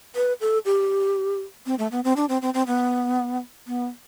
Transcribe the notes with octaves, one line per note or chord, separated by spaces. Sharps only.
B4
A4
G4
C4
A3
B3
C4
D4
C4
C4
C4
B3
B3